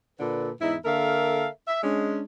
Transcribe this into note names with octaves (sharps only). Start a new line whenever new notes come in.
A#2 D3 A4 B4
E2 G#2 D#4 E4
D3 A#3 A4 A#4 E5 F5
E5
G#3 C#4 D4